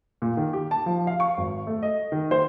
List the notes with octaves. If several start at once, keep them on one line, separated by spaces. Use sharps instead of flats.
A#2
D#3
G4
A5
F3
F5
C#6
G#1
A3
D#5
D#3
C5